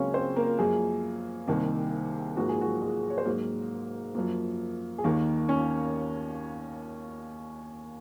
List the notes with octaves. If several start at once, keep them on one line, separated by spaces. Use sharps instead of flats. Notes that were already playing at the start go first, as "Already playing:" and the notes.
Already playing: C#2 C#3 F#3 A#3 C4 C#4 C#5
C4 C5
A#3 A#4
F#2 F3 G#3 A#3 G#4
C2 C3 D#3 A#3
G#2 F3 A#3 F#4
G#4
F#3 F#4
G#3 G#4
C#5
C5
G#2 F#3 A#3 A#4
F#2 F3 A#3
G#4
D#2 D#3 A#3 A#4
C#4 C#5